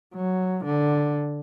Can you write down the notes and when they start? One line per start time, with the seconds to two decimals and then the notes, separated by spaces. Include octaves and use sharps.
0.15 F#3
0.65 D3